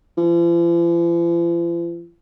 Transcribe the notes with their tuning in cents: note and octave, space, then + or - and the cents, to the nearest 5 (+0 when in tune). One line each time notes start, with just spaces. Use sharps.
F3 -45